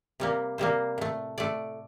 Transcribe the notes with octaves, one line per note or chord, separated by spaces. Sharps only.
C3 G3 A#3
C3 G3 A#3 C5
A2 A3
A2 A3 D5